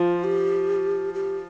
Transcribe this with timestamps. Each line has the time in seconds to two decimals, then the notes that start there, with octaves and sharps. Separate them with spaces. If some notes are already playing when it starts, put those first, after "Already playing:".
Already playing: F3 F4
0.24 G4
1.14 G4